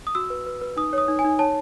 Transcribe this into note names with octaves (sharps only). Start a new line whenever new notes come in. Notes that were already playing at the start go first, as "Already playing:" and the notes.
D#6
F#4 E6
B4
B4
B4
D#4 D#6
C#5 D#6
D#4
G#5
D#4
C#5 A5